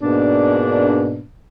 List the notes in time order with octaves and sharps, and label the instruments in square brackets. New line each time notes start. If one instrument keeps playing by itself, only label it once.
[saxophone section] G#2 B2 A#3 D4